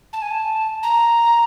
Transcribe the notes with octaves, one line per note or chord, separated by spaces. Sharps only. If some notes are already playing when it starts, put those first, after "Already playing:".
A5
G#5
A5
A#5